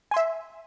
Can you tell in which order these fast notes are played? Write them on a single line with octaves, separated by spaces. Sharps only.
G#5 C6 E5